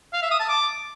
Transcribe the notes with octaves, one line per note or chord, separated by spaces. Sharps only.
F5
E5
D#6
A5
D6